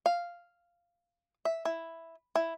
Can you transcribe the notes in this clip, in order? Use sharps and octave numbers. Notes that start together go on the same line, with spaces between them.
F5
E5
E4
E4